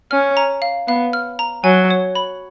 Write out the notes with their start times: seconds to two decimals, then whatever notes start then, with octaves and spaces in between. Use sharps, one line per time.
0.11 C#4 F6
0.37 A#5
0.62 F5
0.88 B3 F5
1.13 F6
1.39 A#5
1.64 F#3 G#5
1.91 C#5
2.15 B5